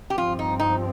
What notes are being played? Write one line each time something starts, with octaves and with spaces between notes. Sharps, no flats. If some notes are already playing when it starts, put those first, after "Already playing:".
G4
G2 F3 C4 F4
D#4
D#4